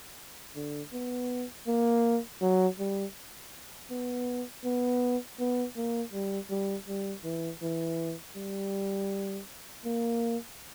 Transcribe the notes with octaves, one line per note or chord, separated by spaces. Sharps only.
D3
B3
A#3
F#3
G3
B3
B3
B3
A#3
G3
G3
G3
E3
E3
G3
A#3